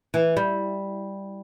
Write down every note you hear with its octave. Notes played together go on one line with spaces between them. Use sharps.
E3
G3